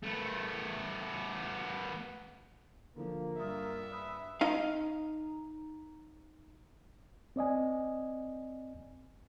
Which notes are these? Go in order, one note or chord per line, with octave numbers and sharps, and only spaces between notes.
A3 B3
D3 F3 A#3
G2 F4 G#4 A#4 E5
G#4 B4
D#4 F5
C4 D5 D#5 G#5